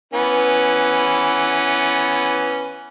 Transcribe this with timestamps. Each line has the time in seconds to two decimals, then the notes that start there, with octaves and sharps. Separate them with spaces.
0.13 E3 B3 C#4